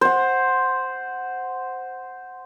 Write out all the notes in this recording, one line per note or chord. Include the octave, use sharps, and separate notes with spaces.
C5 F#5